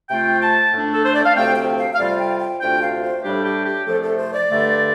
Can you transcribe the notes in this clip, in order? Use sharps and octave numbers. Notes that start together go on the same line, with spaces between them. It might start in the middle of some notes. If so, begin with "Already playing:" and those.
C3 A3 F4 G5
A5
A2 A3 D4
A4
C5
D5
F5
D2 C3 F3 A3 C4 G5
G5
F5
F5
F2 C3 G3 F4 D5
G5
G5
D2 C3 A3 D4 F4 G5
F5
C5
A2 G3 D4 G4
G4
G4
C2 C3 F3 A3 A4
A4
C5
D5
G2 D3 A3